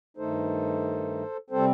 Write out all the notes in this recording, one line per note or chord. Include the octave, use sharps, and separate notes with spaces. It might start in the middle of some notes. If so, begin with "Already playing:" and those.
G2 D#3 A3 D#4 A4 C5
C3 G3 C4 A4 C5